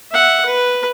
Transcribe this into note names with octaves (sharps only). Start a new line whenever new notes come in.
E5 F#5
B4